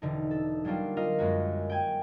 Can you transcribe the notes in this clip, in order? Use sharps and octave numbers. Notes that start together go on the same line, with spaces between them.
E1 D3 D#4
A4
F#3 G3 A#3 D4 F4
F4 A#4 D#5 F5
F#2 G#3 A#3 F#4
G5 G#5